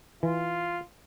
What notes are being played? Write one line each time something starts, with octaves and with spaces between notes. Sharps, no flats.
E3 F4